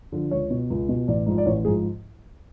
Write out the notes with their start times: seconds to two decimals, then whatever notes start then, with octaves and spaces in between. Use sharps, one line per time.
0.12 D3 F3
0.31 C#2 C#5
0.51 B2
0.70 C#2
0.89 B2
1.08 A1 D5
1.26 G#2 F3
1.38 D5
1.46 A1 C#5
1.65 G#2 F3 G#4